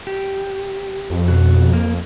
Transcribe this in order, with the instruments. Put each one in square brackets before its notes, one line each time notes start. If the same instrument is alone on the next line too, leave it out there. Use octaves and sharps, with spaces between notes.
[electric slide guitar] G4
[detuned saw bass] F2
[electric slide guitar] B2 F#4
A#3